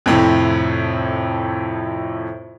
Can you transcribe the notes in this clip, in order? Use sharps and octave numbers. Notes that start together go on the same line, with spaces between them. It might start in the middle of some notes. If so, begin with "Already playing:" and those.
F2 A2 C3